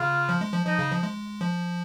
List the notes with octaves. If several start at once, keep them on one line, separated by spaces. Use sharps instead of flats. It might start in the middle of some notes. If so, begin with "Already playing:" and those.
Already playing: C#3 F4
F3
G#3
F3
F3 D#4
C#3
F3
G#3
F3